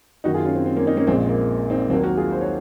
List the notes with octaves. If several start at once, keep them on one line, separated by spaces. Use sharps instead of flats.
F#2 D#3 A#3 D#4 F#4
F4 G#4
C#4 F4
C4
C4
A#3 C#4
C4 D#4
A#3 C#4
A#1 A#2 G#3 C4
A#3
C4 D#4
D#2 D#3 F#3 A#3 C4
F#4 A#4
F4 G#4
C5
C#5